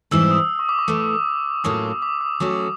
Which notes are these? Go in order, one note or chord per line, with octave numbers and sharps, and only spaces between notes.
G#2 E3 G3 C4 E4 E6
E6
D#6
C#6
D6
C#6
A2 E3 A3
A2 F#3 A#3 C#4 F4 D#6
D6
D#6
F#3 A3 C#4 F#4 D6